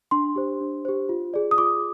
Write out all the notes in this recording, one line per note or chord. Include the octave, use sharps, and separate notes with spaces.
D4 C6
G4 C5
D4
G4 C5
F4
G#4 D5
D#6
F4 D6